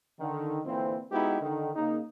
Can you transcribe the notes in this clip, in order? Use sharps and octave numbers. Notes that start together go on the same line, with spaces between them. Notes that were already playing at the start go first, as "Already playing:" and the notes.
D3 D#3
A#2 D3 E3 C4
G#3 B3 D#4 E4 F#4 G4
D3 D#3
C#3 A#3 D#4